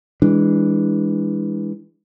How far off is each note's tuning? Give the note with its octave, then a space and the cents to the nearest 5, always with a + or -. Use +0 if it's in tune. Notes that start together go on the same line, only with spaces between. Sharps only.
E3 -10 G#3 -20 D4 +0